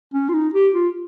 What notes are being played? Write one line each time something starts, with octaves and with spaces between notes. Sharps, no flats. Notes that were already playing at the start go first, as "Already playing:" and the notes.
C#4
F4
D#4
G4
F4